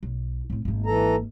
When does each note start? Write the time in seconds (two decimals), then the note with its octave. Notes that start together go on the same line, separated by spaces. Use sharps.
0.03 B1
0.50 A2 C4
0.65 G#1 A#3
0.86 E3 A4 A#5